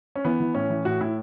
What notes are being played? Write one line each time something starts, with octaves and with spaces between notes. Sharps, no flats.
C#4
E3 B3
E3
A2 C#4
E3
A2 F#4
A2 E4